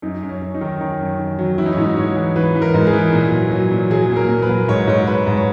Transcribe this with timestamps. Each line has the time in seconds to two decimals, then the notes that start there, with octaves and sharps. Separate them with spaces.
0.02 F#2 D#4
0.23 F#2
0.29 C#4
0.42 F#2
0.55 D#4
0.61 D#3
0.81 D#3 C#4
1.00 F#2
1.20 D#3
1.39 F#3
1.58 E3 E4
1.66 D#4
1.73 C#4
1.77 G#2 D#4
1.97 G#2 C#5
2.16 E3
2.36 E3 B4
2.55 E3
2.62 A#4
2.74 G#2
2.87 G#4
2.93 E3
3.13 A#2
3.32 F#3
3.51 F#3
3.72 A#2
3.91 F#3 G#4
4.10 A#2
4.16 A#4
4.29 A#2
4.42 B4
4.49 F#3
4.68 G#2 C#5
4.87 G#2 C#5
5.07 G#2 B4
5.27 G#2
5.37 C#5